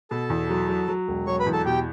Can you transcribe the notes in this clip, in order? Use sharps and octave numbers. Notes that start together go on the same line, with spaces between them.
B2 A4 A5
E2
F#3
F#3
F#3
E1
F#3 C#5 C#6
B4 B5
E2
A4 A5
B2 G4 G5